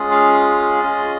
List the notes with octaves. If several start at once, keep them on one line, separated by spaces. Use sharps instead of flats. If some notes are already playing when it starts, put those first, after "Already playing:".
Already playing: G#3 C#4 F4 G#4
F5
C#4 F4 G#4 D#5